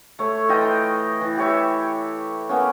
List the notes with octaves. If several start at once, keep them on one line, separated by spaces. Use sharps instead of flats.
A3 C#5
E3 F4 D#5 G5
E3
G4 C#5 E5
A#3 B3 C#4